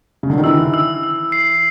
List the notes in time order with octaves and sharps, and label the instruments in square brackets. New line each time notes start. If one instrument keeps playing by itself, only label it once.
[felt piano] C#3
D3
D#3
[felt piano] E3 [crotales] E6
[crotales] E6
E6
C7